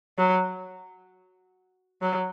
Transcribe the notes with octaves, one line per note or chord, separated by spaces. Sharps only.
F#3
F#3